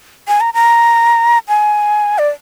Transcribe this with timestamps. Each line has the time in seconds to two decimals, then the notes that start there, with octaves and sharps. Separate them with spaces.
0.28 G#5
0.41 A#5
0.54 A#5
1.48 G#5
2.18 D5